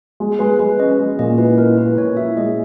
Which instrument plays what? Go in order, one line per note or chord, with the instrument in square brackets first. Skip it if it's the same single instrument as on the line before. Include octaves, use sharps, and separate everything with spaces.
[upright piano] G#3
[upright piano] G#3 [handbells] B4
[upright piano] G#3 [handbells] B4
[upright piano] C#4 [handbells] D#5
[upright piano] G#3
[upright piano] A#2 [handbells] D#5
[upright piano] E4 [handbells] B4
[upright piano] E4 [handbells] A#4
[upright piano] E4 [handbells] B4
[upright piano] A#2 [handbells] C#5
[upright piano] E4 [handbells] E5
[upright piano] G#3 [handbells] D#5